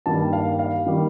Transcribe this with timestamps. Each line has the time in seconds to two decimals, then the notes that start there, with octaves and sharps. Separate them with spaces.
0.06 G2 D#3 G3 A#3 A5
0.33 F5
0.59 F5
0.87 D#3 G3 A#3